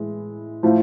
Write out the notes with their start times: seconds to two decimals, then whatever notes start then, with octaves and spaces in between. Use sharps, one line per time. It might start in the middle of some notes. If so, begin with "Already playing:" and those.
Already playing: A2 E3 G#3 E4
0.63 A2 F3